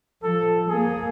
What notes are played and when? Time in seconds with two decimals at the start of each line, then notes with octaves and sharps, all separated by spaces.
0.23 F3 A4
0.69 A#3 G#4